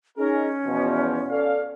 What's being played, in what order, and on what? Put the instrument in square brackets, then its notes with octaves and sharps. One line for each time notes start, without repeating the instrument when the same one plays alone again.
[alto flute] C#4 [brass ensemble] D#4 G#4 A#4
[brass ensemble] E2 B2 F3
A4 D5 F5